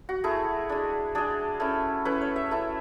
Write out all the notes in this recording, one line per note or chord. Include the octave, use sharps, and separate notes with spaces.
F#4
A3 E4 G#4
G#3 D4
G#3 D4 G#4
A3 C#4 E4
A3 C#4 E4 B4
C#5
E5
A3 C#4 E4